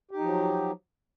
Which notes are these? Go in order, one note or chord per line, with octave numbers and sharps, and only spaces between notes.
F3 F#3 D#4 G4